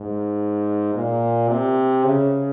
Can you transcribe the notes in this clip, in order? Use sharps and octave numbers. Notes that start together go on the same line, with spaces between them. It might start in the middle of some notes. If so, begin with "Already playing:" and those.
Already playing: G#2
A#2
C3
C#3